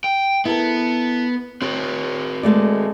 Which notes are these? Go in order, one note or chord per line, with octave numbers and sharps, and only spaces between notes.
G5
B3 E4 A4 A#4
C4 F#4 C#5
G#3 A3 D5